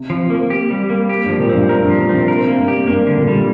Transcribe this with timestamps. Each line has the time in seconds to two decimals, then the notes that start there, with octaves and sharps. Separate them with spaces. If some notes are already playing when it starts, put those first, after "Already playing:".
Already playing: C3
0.10 F3
0.30 A#3
0.50 G4
0.70 G3
0.90 A#3
1.09 G4
1.24 G2 F3
1.40 A#2
1.49 G2 C4
1.69 A#4
1.84 G2 F3
1.98 A#2
2.09 C3 C4
2.28 C3 A#4
2.48 A#3
2.59 G2
2.68 G4
2.87 G2 A#3
3.07 D3
3.17 A#2
3.27 G3